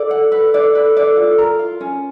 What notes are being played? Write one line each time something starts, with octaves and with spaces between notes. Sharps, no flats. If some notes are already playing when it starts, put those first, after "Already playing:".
Already playing: A4 D5
F#5
B4
D5
B4
D5
F4
A#4
F4
C#4